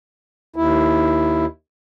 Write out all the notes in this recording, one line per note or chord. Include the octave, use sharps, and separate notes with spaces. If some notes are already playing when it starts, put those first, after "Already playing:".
D#2 E4